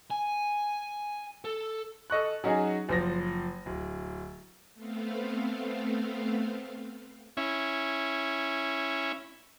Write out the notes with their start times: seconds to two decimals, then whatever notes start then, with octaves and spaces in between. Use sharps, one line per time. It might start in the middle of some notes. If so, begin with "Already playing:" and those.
0.11 G#5
1.44 A4
2.10 A4 D#5 C#6 F#6
2.44 F#3 C#4 D#4 F#4 G#4
2.89 F#1 F3 A#6
3.66 D1
4.74 A3 B3 C4 F5
7.37 C#4 E4